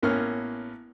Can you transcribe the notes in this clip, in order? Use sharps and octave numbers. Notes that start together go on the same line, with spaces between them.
A1 A#3 B3 C#4 F6